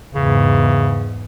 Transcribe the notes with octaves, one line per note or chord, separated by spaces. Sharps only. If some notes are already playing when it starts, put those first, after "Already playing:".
E2 G#2 C#3